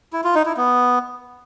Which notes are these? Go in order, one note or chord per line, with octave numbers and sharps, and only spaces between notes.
E4
F4
D#4
E4
B3